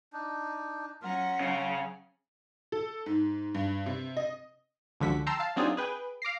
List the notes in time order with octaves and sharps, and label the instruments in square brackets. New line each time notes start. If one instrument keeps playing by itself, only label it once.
[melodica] D4 D#4
[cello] F#3 C#4 [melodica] F4 A#4 [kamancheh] F#5 A#5
[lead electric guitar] C#3 [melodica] C4 G#5
[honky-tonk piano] A4
G#2
G2
C3
D#5
[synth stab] C#2 D3 F3 F#4 B6
G5 A5 A#5 C6 E6
F5 A5
F#3 C4 D4 D#4 F4 G#4
G#4 B4 G5
F5 D6 A#6 C7